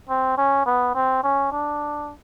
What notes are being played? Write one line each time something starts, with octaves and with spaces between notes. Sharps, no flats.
C4
C#4
B3
C4
C#4
D4